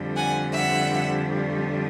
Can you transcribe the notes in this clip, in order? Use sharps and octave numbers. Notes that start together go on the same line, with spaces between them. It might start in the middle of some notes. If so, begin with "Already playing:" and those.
Already playing: F2 D3 G3
F#5 G#5
E5 F#5